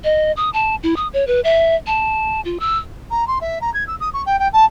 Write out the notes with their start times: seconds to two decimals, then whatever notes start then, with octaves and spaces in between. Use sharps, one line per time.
0.04 D#5
0.37 D#6
0.53 A5
0.83 E4
0.96 D#6
1.13 C#5
1.27 B4
1.44 E5
1.87 A5
2.45 F4
2.60 E6
3.11 A#5
3.28 C6
3.41 E5
3.61 A#5
3.74 G#6
3.87 E6
4.00 D#6
4.14 C#6
4.26 G5
4.39 G5
4.53 A5